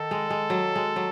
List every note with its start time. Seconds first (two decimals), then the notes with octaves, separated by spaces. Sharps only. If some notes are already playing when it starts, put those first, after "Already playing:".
Already playing: D#3 A4
0.11 G#3
0.30 G#3
0.50 F#3
0.76 G#3
0.96 F#3